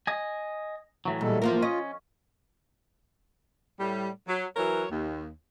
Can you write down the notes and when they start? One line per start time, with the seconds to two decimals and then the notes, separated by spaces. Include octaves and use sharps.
0.07 D#5 G#5
1.05 A2 E3 F#3
1.21 A#2 G3 G#3 A4
1.42 F3 A#3 F4 A#4
1.62 C#4 D#5
3.80 A2 G3
4.27 F#3
4.56 E3 F#3 A#4 C#5
4.91 D#2